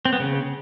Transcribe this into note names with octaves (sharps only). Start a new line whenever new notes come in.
C4
B3
C#3